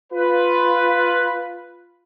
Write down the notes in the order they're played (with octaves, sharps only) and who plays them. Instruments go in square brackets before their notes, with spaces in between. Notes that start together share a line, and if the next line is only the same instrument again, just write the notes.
[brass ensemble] F4 B4